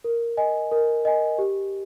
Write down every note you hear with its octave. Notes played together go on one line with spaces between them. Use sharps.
A#4
D#5 G#5
A#4
D#5 G#5
G4